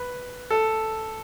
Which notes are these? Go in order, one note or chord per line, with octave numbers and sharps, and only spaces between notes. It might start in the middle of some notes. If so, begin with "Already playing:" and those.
Already playing: B4
A4